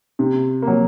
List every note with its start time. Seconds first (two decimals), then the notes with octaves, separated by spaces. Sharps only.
0.19 C3
0.62 A#3
0.68 F#3